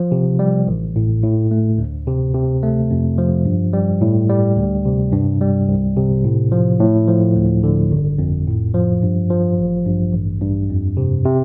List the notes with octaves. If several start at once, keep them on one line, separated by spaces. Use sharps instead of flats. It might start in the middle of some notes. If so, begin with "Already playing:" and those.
Already playing: F3
C3
G3
A1
A2
A2
A3
D2
C3
C3
A3
F2
F3
G2
G3
A2
G3
D2
C3
G2
G3
C2
C3
A2
F3
A2
F3
D2
D3
G1
F2
A2
F3
G2
F3
A1
G2
A1
G2
F2
C3
C3